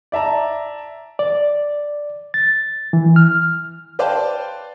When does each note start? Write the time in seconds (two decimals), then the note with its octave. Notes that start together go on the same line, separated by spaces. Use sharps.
0.12 D5 E5 A5 A#5
1.19 D5
2.34 A6
2.93 E3
3.16 F6
3.99 B4 C5 D5 F5 G5 A5